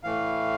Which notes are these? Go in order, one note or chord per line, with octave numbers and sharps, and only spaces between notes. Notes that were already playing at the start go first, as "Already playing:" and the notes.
A2 E3 A3 F5